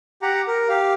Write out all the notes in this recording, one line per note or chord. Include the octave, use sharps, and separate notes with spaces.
G4 F#5 A#5
A#4
G4 F5